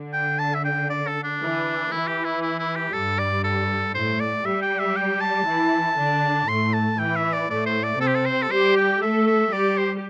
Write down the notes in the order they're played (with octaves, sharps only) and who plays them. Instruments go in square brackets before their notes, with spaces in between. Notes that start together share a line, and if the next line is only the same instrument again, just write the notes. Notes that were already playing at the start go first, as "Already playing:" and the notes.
Already playing: [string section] D3
[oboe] G5
A5
E5
G5
D5
A4
D4
[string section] E3
[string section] E3 [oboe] E4
[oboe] G4
E4
E4
E4
G4
[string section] G2 G3 [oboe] A4
[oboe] D5
A4
[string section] A2 A3 [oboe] C5
[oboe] D5
[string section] G3 G4 [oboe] E5
[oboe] G5
E5
G5
A5
[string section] E3 E4
D3 D4
[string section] A2 A3 [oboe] C6
[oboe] A5
[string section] E3 [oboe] G5
[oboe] E5
D5
[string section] A2 A3 [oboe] D5
[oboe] C5
D5
[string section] C3 C4 [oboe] A4
[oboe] G4
A4
C5
A4
[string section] G3 G4 [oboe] C5
[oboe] G5
[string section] A3 A4 [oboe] E5
[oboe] E5
[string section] G3 G4 [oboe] D5
[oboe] C5